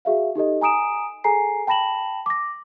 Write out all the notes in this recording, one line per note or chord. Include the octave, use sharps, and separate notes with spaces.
F#4 G#4 E5 F5
D#4 G4 A4 D#5
G#5 A#5 D#6 D7 E7
G#4 A4 G#5 A#5 C7
G5 A5 B5 A#6 E7 F#7
D6 A#6